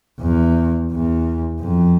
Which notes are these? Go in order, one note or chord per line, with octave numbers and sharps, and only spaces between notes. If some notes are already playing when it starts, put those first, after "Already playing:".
E2
E2
F2